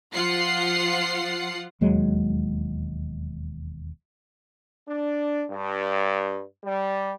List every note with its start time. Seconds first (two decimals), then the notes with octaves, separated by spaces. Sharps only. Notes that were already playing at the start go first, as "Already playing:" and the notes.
0.14 F3 F4 F#5 C7
1.81 E1 D#2 F#3 G#3
4.87 D4
5.49 G2
6.63 G3